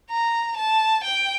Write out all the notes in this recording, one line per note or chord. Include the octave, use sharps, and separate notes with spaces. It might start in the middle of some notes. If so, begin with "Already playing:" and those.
A#5
A5
G5